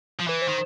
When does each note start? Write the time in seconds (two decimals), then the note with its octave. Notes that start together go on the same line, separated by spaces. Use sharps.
0.20 F3
0.28 E3 B4
0.42 C5
0.49 D#3